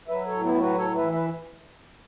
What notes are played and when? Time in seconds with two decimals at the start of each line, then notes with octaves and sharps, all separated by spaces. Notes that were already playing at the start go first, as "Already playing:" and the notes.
0.08 F#3 B4 E5
0.26 A4 C#5
0.32 A2
0.43 B3 E4
0.54 F#3
0.60 F#4 B4
0.77 A2 A4 C#5
0.95 B4 E5
1.01 E3
1.12 B4 E5